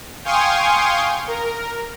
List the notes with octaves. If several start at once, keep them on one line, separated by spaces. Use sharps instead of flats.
F5 G5 G#5 C6 C#6 D#6
A#4